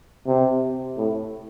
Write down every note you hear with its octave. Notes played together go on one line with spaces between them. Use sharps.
C3
A2